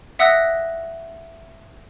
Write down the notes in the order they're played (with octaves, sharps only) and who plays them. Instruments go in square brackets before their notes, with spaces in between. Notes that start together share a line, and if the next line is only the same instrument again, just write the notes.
[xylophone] E5 F#5 D#6 E6 F#6 A#6